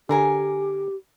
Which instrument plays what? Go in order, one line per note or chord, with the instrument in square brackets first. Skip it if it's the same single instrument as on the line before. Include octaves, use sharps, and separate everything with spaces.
[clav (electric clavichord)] D3 [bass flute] G4 [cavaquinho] G#4 A#4 G#5